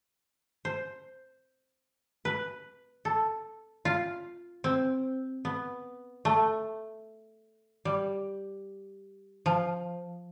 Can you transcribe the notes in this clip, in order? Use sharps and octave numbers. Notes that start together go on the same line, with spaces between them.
C5
B4
A4
F4
C4
B3
A3
G3
F3